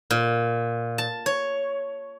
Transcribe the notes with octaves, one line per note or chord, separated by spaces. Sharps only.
A#2
A5
C#5